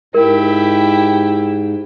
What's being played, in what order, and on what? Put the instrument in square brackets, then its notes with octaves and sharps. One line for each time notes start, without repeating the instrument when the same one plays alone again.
[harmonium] G#2 [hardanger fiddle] E4 G4 [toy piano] A#4